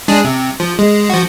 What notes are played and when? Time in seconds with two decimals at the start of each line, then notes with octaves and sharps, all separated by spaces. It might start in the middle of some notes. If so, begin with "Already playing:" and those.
0.08 G#3 D4 G#4
0.24 C3
0.60 F3
0.79 G#3
1.10 F3 F#4